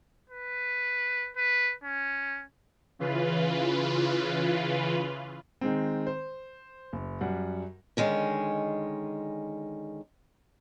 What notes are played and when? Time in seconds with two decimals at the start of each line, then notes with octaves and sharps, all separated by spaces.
0.29 B4
1.37 B4
1.84 C#4
2.99 C#3 E3 F4 B4
5.61 D#3 G#3 C4
6.07 C5
6.93 F#1
7.21 F#2 G3 F#5
7.97 D3 D#3 G#3 C#4